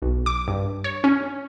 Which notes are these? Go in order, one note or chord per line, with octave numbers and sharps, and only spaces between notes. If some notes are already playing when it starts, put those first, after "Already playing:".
B1
D6
G2
C#5
C#4